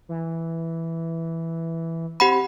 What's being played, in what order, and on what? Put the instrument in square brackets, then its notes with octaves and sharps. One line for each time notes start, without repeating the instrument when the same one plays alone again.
[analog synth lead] E3
[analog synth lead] C4 [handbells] G4 F#5 B5